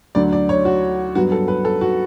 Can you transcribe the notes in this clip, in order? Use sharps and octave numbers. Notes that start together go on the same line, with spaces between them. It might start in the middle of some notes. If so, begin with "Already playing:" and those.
D2 D3 F#3 D5
D5
C#5
F#4
G2 F#3 B3 F#4
A4
B4
A4
F#4